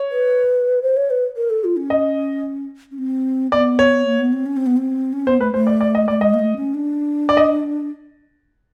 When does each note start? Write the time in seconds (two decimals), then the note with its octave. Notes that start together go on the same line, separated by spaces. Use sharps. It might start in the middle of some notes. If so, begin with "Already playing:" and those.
Already playing: C#5
0.11 B4
0.82 C5
0.97 C#5
1.10 B4
1.37 A#4
1.50 A4
1.64 F4
1.77 C#4
1.90 D#5
2.91 C#4
2.98 C4
3.52 B3 D5
3.79 C#5
4.05 A#3
4.19 B3
4.33 C4
4.46 C#4
4.57 C4
4.66 B3
4.77 C4
5.13 C#4
5.27 B3 C5
5.40 A3 B4
5.54 A3 C5
5.67 D5
5.81 D5
5.95 D#5
6.08 A3 D5
6.21 G#3 D#5
6.34 A#3
6.39 A3
6.57 C#4
6.74 D4
7.29 D5
7.37 D#5